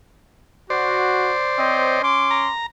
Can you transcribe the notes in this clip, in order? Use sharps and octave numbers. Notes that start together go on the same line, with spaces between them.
F#4 C5 D5
C4 C#5 D#5
C#4 C6 D6
A#5